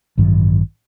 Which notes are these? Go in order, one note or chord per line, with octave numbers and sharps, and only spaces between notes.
A1 G2 D#3 F#3